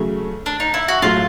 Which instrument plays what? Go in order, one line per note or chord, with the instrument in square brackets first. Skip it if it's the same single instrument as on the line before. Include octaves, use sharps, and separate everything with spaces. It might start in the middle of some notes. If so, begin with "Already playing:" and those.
Already playing: [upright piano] C#3 F#3 A3
[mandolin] D4
D#4
E4
F#4
[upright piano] A2 F#3 A3 [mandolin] F4